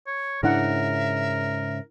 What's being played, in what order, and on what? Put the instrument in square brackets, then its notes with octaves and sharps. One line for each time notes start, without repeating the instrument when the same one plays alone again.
[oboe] C#5
[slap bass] G#2 C#3 [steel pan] D4 E4 F#5 [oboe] A#4 [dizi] E5